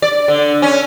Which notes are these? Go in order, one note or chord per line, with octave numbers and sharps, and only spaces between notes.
D5
D3
C#4